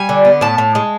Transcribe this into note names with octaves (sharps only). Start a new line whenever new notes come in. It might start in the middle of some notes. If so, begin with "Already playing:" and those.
Already playing: G3 G#5
D3
B3
A2 A5
A2
G#3